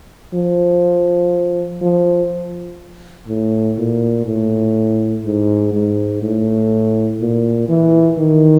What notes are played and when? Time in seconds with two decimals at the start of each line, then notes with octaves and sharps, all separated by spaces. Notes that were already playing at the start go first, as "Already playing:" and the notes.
0.34 F3
1.82 F3
3.28 A2
3.78 A#2
4.26 A2
5.25 G#2
5.73 G#2
6.22 A2
7.21 A#2
7.69 E3
8.19 D#3